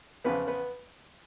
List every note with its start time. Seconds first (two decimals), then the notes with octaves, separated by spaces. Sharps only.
0.24 E2 C#3 F3 B3 B4
0.47 B3 B4